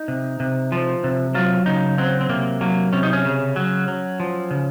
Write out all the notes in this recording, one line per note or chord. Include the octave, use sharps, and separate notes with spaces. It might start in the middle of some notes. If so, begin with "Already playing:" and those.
Already playing: D#4
C3
C3
F3
C3
F#3 F4
C#3 D#4
F#3 C4
C4
C3 A#3
F#3 A#3
C3 C#4
D#4
C#4
C#3
F#3
F#3
F3
C#3